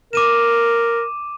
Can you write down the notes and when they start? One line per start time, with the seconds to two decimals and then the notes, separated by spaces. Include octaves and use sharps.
0.13 A#4 D6 D#7 E7